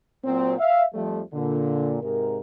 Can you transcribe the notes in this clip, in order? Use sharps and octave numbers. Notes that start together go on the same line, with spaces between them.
A#2 F#3 C4
E5 F5
F2 F3 G3 A3
A#2 D3
G#2 C3 A#4